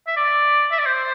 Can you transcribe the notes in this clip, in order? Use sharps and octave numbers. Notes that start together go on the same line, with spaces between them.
E5
D5
E5
D5
C5